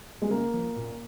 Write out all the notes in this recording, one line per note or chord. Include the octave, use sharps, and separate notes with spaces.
G#3
C#3 A#3
F3
A#2